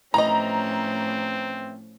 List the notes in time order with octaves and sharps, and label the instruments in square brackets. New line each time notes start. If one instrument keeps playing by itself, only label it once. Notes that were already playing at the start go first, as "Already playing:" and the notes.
[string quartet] A2 F3 C#4 [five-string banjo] E3 D#5 [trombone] C4 [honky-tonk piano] A#5